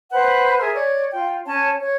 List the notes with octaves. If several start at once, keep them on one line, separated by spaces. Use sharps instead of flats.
B4 C5 F#5
G#4 A#4 E5
C#5 D5
F4 G5
C#4 C#5 A5
C#5